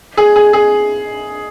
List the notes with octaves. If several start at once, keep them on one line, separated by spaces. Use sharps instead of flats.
G#4
G#4
G#4